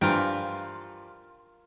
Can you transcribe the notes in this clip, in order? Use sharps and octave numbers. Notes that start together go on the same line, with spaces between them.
G2 E3 F3 F4 A#4 G5